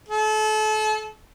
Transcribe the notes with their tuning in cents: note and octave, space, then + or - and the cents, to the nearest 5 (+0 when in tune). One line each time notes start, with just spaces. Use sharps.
A4 -35